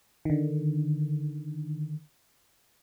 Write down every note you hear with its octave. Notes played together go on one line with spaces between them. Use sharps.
D3 D#3